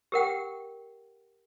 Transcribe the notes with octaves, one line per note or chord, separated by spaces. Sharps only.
G4 A#4 F#5 G5